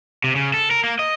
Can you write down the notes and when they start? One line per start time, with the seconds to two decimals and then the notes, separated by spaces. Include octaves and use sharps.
0.24 C3
0.36 C#3
0.54 A4
0.71 A#4
0.84 A#3
0.99 D#5